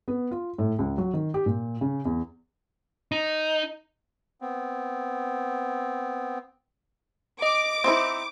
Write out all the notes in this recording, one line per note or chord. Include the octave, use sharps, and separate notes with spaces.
B3
F4
A2
C#2
F#3
D#3
G4
A#2
C#3
E2
D#4
B3 C4
D#5 D6
C4 D#4 E4